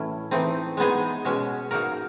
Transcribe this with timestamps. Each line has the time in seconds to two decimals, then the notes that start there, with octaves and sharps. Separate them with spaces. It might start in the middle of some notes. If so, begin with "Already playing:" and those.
Already playing: A2 E3 A3 C#4 E4
0.31 E3 A3 C4 D#4
0.77 G#3 B3 D#4 G#4
1.25 B2 G#3 C#4 F#4
1.71 A#3 D#4 F#4 A#4